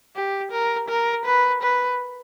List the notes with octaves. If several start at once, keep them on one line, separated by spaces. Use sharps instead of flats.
G4
A#4
A#4
B4
B4